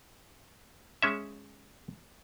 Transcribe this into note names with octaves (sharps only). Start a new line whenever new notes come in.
G#3 C#4 E5